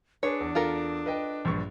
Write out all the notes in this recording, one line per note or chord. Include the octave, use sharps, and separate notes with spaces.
D4 G#4 B4 C#5
E2
F4 A4 A#4
B4 D#5 G5
A#1 G2 C#6